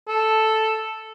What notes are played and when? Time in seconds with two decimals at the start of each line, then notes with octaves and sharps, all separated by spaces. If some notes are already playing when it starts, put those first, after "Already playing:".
0.08 A4